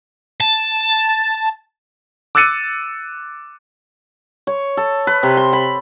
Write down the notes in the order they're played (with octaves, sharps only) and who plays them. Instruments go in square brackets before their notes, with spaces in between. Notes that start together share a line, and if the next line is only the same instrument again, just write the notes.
[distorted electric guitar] A5
[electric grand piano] D6 E6 F#6 A6 C#7 D#7
[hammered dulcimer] C#5
A4
B4
C3
C6
B5